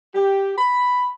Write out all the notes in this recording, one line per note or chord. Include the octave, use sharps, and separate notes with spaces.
G4
B5